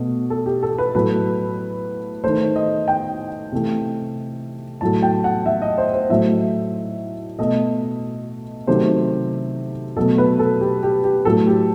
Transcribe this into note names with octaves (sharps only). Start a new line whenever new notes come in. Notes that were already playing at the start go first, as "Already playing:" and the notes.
Already playing: B2 A3
A4
G4
A4
B4
A2 F#3 A3 B4
D#3 A3 C5
D#5
G5
C3 E3 A3
A2 F#3 A3 A5
G5
F#5
E5
D#5
C5
C5
A2 F#3 A3 E5
B2 A3 D#5
C3 D#3 F#3 A3 C5
B2 F#3 A3 A4
B4
A4
G4
G4
G4
A2 F#3 A3 A4
G4